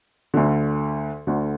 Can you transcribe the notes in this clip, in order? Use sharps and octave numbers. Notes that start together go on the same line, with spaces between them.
D2 D3
D2 D3